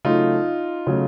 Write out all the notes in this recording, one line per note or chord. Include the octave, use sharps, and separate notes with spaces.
C#3 F#3 A3 D#4 F4
C#3 F#3 A3